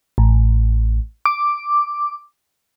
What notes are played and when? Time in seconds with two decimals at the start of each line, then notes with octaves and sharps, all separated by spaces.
0.18 A1
1.26 D6